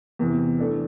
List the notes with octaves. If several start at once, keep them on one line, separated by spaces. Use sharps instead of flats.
E2 C3 E3
E3 A3 D4 A4